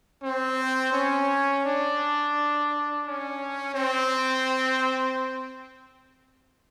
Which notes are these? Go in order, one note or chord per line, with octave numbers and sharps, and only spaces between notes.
C4
C#4
D4
C#4
C4